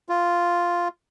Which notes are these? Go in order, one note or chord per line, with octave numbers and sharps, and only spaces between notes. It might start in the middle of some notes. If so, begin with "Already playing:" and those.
F4